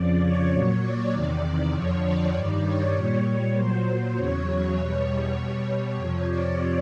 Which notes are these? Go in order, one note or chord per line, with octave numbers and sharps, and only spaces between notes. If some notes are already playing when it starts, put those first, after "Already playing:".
Already playing: F2 C#3 F3 D5
C#5
A#2 F#3
D5
E2 C3 D#3
F2 D3 F3 C#5
D5
G2 D#3 G3
C#5
A#2 G3 C#5
A#2 F#3 C5
E2 C#3 F#3 C#5
E2 B2 G3
C#5
B2 G3
C#5
F2 C3 F3
D5